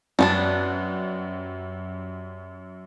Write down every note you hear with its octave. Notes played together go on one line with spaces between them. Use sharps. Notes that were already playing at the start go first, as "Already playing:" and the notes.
F#2 G3 B3 D4